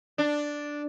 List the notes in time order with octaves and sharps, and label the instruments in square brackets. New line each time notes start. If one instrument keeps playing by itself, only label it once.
[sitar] D4